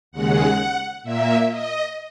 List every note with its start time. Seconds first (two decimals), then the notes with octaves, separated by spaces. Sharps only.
0.12 D#2 C#3 G#3 F#5
1.03 A#2 A#3 E5
1.50 D#5